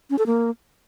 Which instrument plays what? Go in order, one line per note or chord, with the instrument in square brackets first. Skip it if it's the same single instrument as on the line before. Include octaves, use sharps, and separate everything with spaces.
[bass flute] C#4
A4
A#3